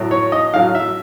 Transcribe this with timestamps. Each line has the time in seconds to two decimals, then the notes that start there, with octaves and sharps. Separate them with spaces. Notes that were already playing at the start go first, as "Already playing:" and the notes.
Already playing: A2 F#3
0.11 C#5
0.32 D#5
0.54 A2 F#3 F5
0.75 E5